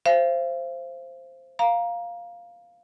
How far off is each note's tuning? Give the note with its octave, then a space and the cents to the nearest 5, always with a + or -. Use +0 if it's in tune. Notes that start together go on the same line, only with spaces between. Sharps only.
C5 +5 F5 -40
F5 +0 A#5 +15